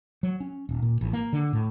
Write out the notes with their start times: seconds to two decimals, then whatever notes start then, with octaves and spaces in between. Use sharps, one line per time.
0.23 F#3
0.40 C#4
0.69 D#1
0.82 A#2
1.01 A1
1.13 A#3
1.33 D3
1.53 A2